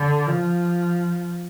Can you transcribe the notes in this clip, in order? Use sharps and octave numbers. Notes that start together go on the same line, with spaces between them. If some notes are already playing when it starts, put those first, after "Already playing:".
Already playing: D3
F3